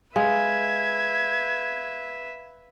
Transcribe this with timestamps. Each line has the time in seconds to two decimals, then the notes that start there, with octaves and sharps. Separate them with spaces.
0.16 G#3 B4 E5 F5 G#6